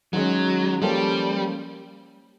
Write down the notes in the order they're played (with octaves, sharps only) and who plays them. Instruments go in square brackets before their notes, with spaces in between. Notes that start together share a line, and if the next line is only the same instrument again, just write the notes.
[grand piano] D#3 G#3 C#4 [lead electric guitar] F#3
[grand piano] F3 A#3 C#4 F4 A4 [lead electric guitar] G3